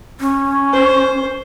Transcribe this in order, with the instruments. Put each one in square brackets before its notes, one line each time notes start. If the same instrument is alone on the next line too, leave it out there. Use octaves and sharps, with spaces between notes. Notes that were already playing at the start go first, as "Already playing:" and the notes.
[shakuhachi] C#4
[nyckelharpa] C5